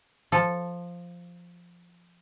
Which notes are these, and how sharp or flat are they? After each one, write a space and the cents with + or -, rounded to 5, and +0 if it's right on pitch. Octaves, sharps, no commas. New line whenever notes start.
F3 +0 A4 +0